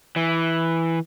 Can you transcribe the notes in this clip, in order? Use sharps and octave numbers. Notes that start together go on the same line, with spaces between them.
E3